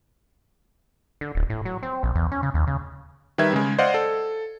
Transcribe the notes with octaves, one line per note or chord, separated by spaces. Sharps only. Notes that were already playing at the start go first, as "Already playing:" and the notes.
D3
D1
A2
F#3
C4
A#1
E2
C#4
C#3
D#2
C#3
D#3 G3 B4 E5 G#6
C#3 G#3
C5 D5 D#5 F5 F#5
A4